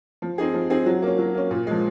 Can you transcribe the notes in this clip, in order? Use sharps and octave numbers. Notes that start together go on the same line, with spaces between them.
F3
C4 D#4 G#4
F3
C4 D#4 G#4
F#3
A#3 C#4
F#3
A#3 C#4
A#2
F3 G#3